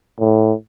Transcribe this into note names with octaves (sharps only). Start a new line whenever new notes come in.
A2